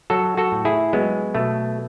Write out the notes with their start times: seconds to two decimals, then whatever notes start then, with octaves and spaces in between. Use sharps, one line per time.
0.10 F#3 F#4 A4
0.37 F#4 A4
0.52 A2
0.65 E4 G#4
0.93 F#3 G#3 B3
1.35 B2 A3